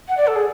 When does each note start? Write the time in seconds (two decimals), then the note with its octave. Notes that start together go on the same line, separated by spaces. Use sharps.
0.08 F#5
0.17 D5
0.27 A4
0.35 G#4